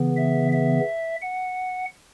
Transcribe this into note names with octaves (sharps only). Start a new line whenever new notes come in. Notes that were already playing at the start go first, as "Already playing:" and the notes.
Already playing: C#3 E3 B3
E5
E5
F#5